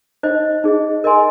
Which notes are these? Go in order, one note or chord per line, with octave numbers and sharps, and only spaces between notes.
D#4 C5 D#5
D#4 G#4 D#5
A#4 D#5 G#5 C6